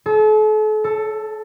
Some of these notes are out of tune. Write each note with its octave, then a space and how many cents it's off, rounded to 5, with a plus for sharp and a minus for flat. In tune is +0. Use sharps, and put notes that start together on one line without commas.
A4 -40
A4 +10